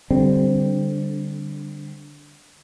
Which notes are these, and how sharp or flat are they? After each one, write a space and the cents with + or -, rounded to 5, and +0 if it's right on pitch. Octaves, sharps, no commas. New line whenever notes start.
D3 +0 G3 +0 C4 +0